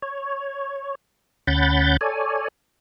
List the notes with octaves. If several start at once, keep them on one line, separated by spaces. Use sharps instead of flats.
C#5
D2 C#4 F#5 B5 G6 A6
A4 C#5 D5 G#5